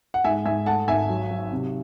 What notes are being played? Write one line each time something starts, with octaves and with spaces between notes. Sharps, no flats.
F#5
G#2 E5 G#5
G#2 E5 G#5
A3 F#5 A5
G#1 E5 G#5
F#3
F#3
C3